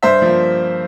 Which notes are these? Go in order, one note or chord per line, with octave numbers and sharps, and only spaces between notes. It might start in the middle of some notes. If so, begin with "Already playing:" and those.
G2 C5 E5
F3 A#3